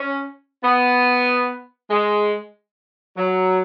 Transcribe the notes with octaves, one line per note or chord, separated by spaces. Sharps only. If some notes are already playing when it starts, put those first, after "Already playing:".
Already playing: C#4
B3
G#3
F#3